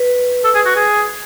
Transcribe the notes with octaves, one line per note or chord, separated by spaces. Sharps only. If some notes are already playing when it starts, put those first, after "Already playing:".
Already playing: B4
A4
G#4
F#4
G#4